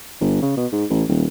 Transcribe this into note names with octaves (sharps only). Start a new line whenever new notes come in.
G1
C#3
B2
G#2
A1
D#1